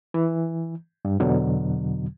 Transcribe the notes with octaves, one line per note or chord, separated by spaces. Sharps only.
E3
G2
E2 B2 D3 F#3